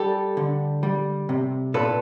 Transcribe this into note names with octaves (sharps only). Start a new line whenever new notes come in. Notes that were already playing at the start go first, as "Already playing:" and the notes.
Already playing: G3 G4 A4
D3
G3
C3
A#2 A4 B4